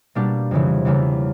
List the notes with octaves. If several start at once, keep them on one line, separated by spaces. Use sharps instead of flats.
B2 G3 A#3 D4 G4
F2 C#3 E3
E2 C#3 E3 G3 A#3